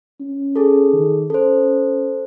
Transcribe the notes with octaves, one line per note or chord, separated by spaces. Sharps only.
C#4
G#4 A4
D#3
C#4 A4 C5